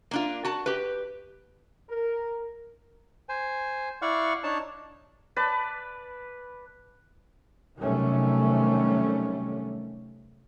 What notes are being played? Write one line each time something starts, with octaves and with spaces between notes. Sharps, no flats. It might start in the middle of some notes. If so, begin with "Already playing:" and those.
A#3 D4 F4
F#4 A5
G4 B4
A#4
C5 G#5
E4 D5 F5 F#5 C#6
D4 D#4 C#5 A5
B4 D5 A5
C3 D#3 F#3 G3 A3 C#4